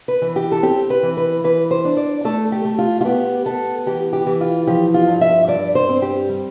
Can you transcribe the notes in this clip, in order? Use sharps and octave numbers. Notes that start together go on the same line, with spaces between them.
B4
E3
G4
A4
C4 G4
B4
E3
B4
E3 B4
C5
D4
D5
A3 A4
G4
A3
F4
F4
B3 G4
B3 A4
E3 G4
G4
E3
F4
F3 G4
F4
G2
E5
G2 D5
C5
C4
G4
G3